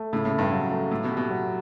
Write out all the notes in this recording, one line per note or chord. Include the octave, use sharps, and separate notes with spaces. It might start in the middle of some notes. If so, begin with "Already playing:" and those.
Already playing: A3
A2 C#3
A2
C#3
G2
F#3
A3
A2 E4
B2
G4
B2
F#3